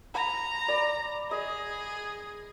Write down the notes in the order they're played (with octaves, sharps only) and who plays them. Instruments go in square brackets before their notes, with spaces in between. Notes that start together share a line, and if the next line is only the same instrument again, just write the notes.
[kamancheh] A#5 [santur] B5
[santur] D5 B5
[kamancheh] G#4 [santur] D#5